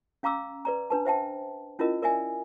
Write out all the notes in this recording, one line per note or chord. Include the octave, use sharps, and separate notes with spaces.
C#4 F5 A#5 D6 E6
B4 D5 A#5
D4 B4 A5
C5 E5 G5 A5
C#4 E4 F4 A#4 D#5
A#4 D5 E5 G#5